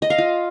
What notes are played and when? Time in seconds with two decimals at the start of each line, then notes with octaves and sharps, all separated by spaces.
0.02 D#5
0.10 F5
0.18 F4